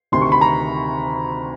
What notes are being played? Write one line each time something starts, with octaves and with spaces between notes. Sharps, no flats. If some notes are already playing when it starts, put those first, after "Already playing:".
D2 C3 D#3 C6
C#6
B5
A#5